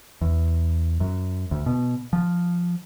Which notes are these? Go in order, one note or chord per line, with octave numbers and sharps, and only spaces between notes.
E2
F#2
D2
B2
F3